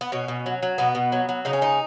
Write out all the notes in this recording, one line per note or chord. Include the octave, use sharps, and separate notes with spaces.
B3
B2 C#4
B2
F#3
F#3
B2 B3
B2
F#3
F#3
C#3 D#4
C#4
G#3 D#4